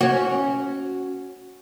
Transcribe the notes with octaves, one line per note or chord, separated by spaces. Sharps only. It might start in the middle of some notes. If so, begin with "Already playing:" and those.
C#4 F#4